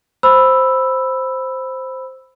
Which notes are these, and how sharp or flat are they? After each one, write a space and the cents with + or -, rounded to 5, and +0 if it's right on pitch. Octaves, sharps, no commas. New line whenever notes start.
C5 +0 B5 +0 E6 +0